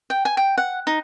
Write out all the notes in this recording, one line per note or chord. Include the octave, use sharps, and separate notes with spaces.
G5
G#5
G5
F#5
D#4